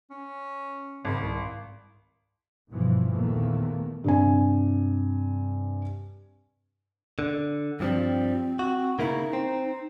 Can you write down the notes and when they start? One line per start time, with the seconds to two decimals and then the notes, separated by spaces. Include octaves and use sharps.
0.11 C#4
1.05 G#1 C#3
1.21 C2
2.71 G1 G#2 B2 E3 F3
3.12 A#1 E2 A#2 D#3 A3 A#3
4.04 G2 C3 G#5
7.19 D3
7.80 G2 F3 G3 C4
8.59 F#4
8.99 C#3 A#3 D#4 E4
9.33 C4